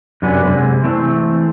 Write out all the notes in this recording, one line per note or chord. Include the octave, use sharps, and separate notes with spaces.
F#2 C3 D4 F#4 B4 G#5
C3 G#3
E3 A3 C4